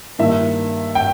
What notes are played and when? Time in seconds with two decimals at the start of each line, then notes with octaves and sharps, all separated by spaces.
0.19 G2 D#3 A#3 E4 E5
0.95 G5